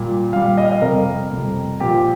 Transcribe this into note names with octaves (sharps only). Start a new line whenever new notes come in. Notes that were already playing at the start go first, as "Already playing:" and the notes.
Already playing: A#2 G3
A#2 G3 F5
D#5
F5
D#5
F2 C3 G3 A#4
F2 C3 G3
A#2 F3 G4